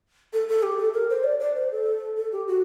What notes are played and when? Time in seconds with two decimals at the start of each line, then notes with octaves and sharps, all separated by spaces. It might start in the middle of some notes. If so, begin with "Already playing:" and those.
0.33 A4
0.49 A4
0.63 G4
0.78 A4
0.94 A#4
1.10 C5
1.24 D5
1.40 D5
1.56 C5
1.71 A4
2.17 A4
2.32 G4
2.47 F#4